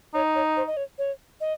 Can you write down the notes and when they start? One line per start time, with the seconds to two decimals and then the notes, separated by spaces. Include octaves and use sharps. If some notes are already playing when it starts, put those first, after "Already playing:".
0.14 D#4 C#5
0.35 C#5
0.57 C5
0.67 D#5
0.77 C#5
0.98 C#5
1.40 D#5